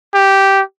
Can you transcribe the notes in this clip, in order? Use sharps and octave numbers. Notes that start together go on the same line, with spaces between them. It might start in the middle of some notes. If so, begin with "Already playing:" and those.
G4